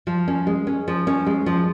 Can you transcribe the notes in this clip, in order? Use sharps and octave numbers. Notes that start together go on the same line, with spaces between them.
F3
C#4
G#3
C#4
F3
C#4
G#3
F3